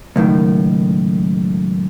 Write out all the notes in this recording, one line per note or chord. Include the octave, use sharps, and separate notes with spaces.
C#2 F#2 A2 D#3